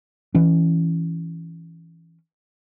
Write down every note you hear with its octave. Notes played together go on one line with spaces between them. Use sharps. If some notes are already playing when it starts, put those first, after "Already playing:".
E3 C#4